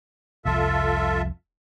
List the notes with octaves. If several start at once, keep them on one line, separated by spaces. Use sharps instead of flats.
F1 C2 F3 F4 A4 E5